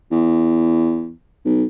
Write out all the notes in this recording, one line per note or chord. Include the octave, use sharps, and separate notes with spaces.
E2
B1